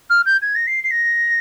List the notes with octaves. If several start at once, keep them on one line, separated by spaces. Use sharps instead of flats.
F6
G6
G#6
A#6
C7
C7
A#6